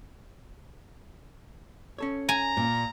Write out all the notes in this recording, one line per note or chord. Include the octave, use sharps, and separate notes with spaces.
C#4 A4 C#5
G#5 A#5
A#2